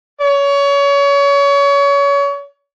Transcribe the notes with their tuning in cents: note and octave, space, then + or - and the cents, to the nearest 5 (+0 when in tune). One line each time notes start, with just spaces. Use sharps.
C#5 +30